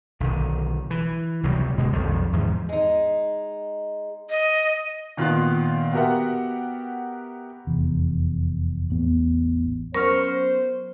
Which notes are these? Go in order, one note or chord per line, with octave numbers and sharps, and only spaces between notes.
B1 D3 D#3
E3
C#2 C3 F#3 G3
B2 D3 G#3 A#3
B1 F2 D#3 G3
E2 G#2 D#3 F3
G#3 D#4
D#5
A#2 D#3 B3 F4 F5 F#6
B3 F#4 G4 A#4 E5 F#5
F1 E2
A1 E2 B3
F#3 B3 C#4 A#4 C5 C#6 F6